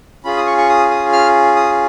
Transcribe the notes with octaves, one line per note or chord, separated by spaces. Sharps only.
C#4 F4 G#4 B5
D#6
C#6
C#6
D#6
D#6
F6
D#6